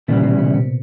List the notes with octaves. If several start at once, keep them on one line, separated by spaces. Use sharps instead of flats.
D#2 A#2 C#3 E3 G3
B2
C3
C3